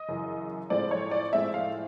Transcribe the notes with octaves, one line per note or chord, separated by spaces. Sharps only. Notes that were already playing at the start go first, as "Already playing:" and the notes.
Already playing: D#5
F#2 C#3 E3
A2 F3 G#3 C4 D5
C#5
D5
A2 F3 G#3 C4 E5
F5